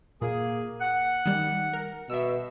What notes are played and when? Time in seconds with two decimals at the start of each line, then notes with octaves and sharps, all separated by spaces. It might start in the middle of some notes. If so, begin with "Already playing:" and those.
0.22 A#2 A#3 G#4
0.81 F#5
1.25 D#3 G3
1.73 A#4
2.10 B2 E5 E6